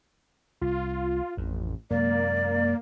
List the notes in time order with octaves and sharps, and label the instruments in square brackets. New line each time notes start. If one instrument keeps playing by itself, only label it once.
[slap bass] C2 [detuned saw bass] F4
[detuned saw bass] A1 [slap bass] F2
[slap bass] F#2 C3 G#3 [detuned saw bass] A#3 [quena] D5